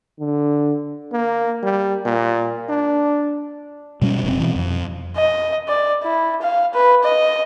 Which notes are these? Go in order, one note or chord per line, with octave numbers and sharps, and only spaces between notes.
D3
A#3
G3
A#2
D4
B2 G3 A#3 C#4
F1 G#2 C4
B2 E3
F2
D#5
D5
E4
F5
B4
D#5